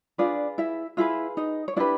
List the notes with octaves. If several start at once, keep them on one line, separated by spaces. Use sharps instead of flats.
D4 F4 G#4 B4 D5
E4 E5
E4 F4 G#4 B4 E5
D#4 D#5
C#5
D4 E4 G4 B4 D5